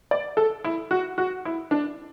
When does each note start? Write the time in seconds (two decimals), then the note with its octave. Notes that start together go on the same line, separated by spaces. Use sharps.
0.11 D5
0.37 A4
0.64 E4
0.91 F#4
1.18 F#4
1.45 E4
1.71 D4